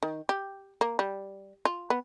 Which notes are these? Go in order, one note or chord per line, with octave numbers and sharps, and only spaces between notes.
D#3
G4
A#3
G3
F4
B3